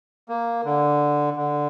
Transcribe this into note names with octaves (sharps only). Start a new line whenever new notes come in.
A#3
D3
D3